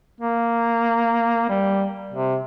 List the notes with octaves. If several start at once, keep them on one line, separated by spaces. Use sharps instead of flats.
A#3
G3
C3